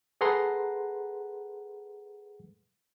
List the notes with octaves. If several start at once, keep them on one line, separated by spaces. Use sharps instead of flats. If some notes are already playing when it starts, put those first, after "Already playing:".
G#4 A4 B4 F#5 A#5 C6